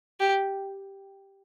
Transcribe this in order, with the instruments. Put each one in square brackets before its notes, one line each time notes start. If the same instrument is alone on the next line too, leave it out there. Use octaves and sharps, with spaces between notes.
[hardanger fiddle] G4